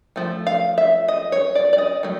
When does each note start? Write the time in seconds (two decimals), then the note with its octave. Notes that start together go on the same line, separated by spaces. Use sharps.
0.16 F3 A3
0.47 F5
0.78 E5
1.08 D#5
1.32 C#5
1.55 D5
1.73 D5
1.78 D#5
2.03 F#3 A3